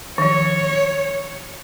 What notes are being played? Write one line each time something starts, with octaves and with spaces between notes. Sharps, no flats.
D#3 F3 C#5